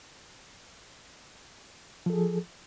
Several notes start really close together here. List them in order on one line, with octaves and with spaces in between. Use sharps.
F3 A4 G#4